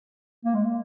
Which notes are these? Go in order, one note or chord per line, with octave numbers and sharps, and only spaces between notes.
A#3
G#3
A#3